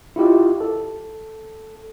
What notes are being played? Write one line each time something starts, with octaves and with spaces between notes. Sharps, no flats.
E4 F4 G4 D#5
A4